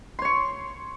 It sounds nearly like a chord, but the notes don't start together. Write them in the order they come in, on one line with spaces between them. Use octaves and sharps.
C6 C#5 C#6